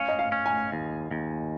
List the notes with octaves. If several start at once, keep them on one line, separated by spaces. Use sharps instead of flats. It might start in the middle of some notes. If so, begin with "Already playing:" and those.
Already playing: C#4 F5
D#5
F5
C#4
G#5
D#2
D#2